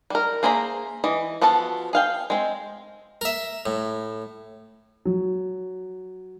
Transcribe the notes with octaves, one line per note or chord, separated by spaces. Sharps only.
G3 A#4
A#3 G#4 C5 E5 A#5
E3 D#5
F3 B3 F#4 A4 A5
G#4 F5 G5
G#3 C4
A#4 E5
A2
F#3